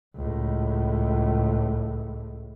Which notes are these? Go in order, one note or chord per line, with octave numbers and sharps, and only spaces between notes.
C#2 A2